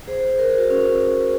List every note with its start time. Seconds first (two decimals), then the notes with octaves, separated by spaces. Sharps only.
0.07 G#4 C5
0.39 A#4
0.48 G#4
0.58 F#4 A#4
0.70 C#4